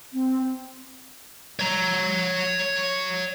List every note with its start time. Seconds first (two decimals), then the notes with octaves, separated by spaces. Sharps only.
0.13 C4
1.60 C#5 A#5